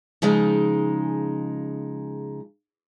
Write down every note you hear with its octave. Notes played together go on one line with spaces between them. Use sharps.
C#3 F3 G#3 D#4